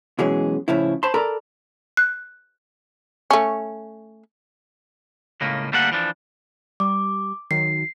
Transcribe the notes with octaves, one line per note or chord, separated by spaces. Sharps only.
B2 E3 F#3 G#3 C#4 G#4
A2 C#3 F3 E4
C5 A5 B5 C6
A4 A#4 D5 A#5 B5
F#6
A3 C#4
C#2 A2 C#3 A#3
D2 G3 A#3 A4 F#5
E3 F3 D4
G3 D6
D#3 F#3 C7